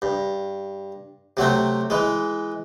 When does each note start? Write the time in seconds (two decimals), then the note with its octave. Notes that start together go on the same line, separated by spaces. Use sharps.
0.02 G2
1.37 C3 F#3 A3 C4
1.90 E3 G#3